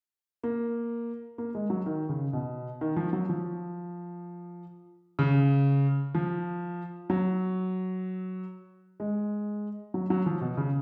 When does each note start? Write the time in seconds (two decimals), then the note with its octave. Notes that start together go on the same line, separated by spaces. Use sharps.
0.43 A#3
1.38 A#3
1.55 G#3
1.70 F#3
1.86 D#3
2.09 C#3
2.33 B2
2.81 D#3
2.96 F3
3.13 F#3
3.29 F3
5.19 C#3
6.15 F3
7.10 F#3
9.00 G#3
9.94 F#3
10.10 F#3
10.26 F3
10.41 B2
10.57 C#3